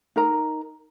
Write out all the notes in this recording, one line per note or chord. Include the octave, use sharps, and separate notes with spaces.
D#4 A#4 A#5